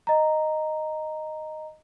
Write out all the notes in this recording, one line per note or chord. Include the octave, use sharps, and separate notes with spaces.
D#5 A#5